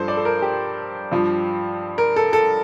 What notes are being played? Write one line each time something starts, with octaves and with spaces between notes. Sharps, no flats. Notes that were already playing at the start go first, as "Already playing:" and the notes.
Already playing: G2 F3 A4 C5
D5
A4
A#4
G4
G2 F3
A#4
A4
A4